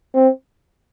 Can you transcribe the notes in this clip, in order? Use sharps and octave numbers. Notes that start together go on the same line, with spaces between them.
C4